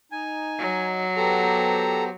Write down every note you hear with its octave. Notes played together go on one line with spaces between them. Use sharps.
D#4 G#5
F#3
B3 G4 A4 C5 A#5